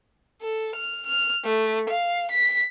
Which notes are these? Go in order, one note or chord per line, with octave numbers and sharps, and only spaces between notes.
A4
F6
F6
A3
F5
B6